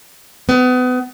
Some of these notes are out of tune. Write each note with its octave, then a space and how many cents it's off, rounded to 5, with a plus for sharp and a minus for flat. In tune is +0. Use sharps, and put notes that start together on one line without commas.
B3 +30